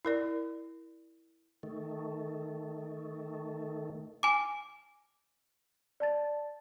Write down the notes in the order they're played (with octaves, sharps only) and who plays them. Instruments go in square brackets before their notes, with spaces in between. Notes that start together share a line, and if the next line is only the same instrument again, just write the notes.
[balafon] E4 A#4 D5
[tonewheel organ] D#3 A3
[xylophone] G#5 D6
[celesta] D5 A5 A6